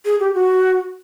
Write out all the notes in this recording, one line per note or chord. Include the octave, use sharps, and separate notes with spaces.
G#4
G4
F#4